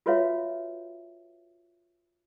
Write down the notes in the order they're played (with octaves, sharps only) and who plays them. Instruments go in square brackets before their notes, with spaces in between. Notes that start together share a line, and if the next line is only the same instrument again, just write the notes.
[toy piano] F4 F#4 B4 C#5 E5 F5